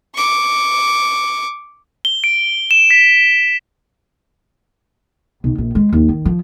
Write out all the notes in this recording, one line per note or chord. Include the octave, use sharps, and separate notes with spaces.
C#6 D6
G7
D7
E7
B6
E7
B1
A#1
G#3
D#2
D#3
F3